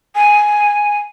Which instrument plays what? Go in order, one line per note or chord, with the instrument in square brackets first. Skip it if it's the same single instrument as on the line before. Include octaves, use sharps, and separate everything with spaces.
[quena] G#5